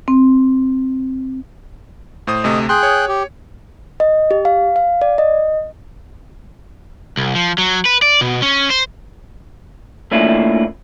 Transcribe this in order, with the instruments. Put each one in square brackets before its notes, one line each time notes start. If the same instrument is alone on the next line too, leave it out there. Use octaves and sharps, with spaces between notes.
[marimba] C4
[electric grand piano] A2 C5 D#6
[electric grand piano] D2 C3 A3 [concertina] D#5
[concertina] G#4 G5 F#6 [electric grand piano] C6
[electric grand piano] C#5
[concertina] G4
[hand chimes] D#5
G4
F5
F5
D5
D#5
[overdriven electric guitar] C2
F3
F#3
B4
D5
B2
C#4
C5
[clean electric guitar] A3 A#3 C#4 D4 E4 F4